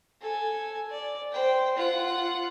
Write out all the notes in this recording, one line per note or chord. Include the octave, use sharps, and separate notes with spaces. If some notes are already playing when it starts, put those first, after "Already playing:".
A4 G#5
D5
C5 G5
F4 F#5